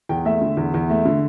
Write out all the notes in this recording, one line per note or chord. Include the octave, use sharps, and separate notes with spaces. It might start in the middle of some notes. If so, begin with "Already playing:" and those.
E2 G5
A3 E5
D3
E2
E2
A3
D3